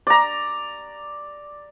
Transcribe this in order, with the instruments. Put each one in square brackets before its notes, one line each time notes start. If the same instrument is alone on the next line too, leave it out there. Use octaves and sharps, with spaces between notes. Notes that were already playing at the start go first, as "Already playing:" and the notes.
[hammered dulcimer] D5 A#5